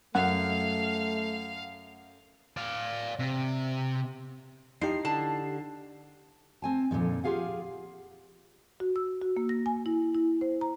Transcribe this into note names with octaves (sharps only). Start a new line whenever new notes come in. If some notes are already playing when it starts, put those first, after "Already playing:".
F#2 A3 F5 F#5
D5 F5
C3
F3 D#4 E4 G4 C7
D3 A5
C4 G#5 A5
F2 A#2 D3 F3 D#4
F4 G4 G#4 F5 F#5
F#4
E6
F#4
A#3
A#6
G#5
E4
E4
C5
A#5